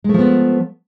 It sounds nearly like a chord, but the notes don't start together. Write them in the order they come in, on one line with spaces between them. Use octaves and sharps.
G#3 A3 F3 B3